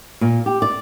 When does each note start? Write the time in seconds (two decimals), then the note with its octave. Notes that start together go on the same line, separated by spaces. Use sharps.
0.21 A#2
0.46 G4
0.62 D5